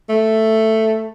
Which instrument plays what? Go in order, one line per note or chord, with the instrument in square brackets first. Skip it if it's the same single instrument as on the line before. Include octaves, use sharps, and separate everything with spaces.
[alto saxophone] A3